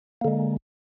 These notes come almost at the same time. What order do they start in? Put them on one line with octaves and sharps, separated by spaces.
A#3 D3 G#3